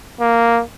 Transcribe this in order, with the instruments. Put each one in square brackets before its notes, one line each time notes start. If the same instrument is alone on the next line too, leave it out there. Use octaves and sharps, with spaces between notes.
[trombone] A#3